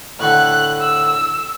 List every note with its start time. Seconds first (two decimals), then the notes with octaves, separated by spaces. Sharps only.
0.20 A2 D3 F#6
0.81 E6